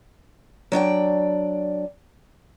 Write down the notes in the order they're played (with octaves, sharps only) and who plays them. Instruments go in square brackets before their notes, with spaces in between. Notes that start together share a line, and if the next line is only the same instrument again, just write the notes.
[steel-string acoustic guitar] F#3 D4 D5 G5